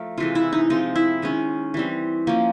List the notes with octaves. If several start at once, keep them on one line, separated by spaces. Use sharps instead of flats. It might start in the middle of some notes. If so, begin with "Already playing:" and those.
Already playing: F3 A3 A#4
C3 E3 G#3 F4
E4
D#4
F3 G#3 C4 D#4
E4
D#3 G#3 C#4
E3 G3 C4
F3 A#3 C#4